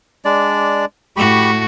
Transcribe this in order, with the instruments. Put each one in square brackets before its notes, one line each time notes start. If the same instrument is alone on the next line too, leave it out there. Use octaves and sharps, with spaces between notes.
[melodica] G#3 D4 D5
[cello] A2 F#4 [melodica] G4 B5 C#6